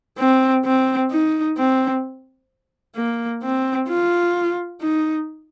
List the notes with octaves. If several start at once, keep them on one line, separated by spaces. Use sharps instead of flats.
C4
C4
D#4
C4
A#3
C4
F4
D#4